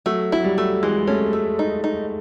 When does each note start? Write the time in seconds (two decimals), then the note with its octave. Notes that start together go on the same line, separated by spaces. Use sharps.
0.06 F#3 A3
0.32 F#3 E4
0.44 G3
0.58 A3
0.83 E3 G#3
1.07 A3 C#4
1.33 G#3 A3
1.59 D#4
1.84 D#4